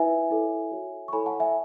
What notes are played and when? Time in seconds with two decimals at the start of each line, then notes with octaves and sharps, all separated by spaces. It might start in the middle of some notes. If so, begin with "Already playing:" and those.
Already playing: E4 B4 E5 G#5
0.31 E4 A4 C#5
0.72 F#4 A4 C#5
1.08 C#6
1.13 E4 A4 C#5 G#5 B5
1.26 F#5 A5
1.40 E5 G#5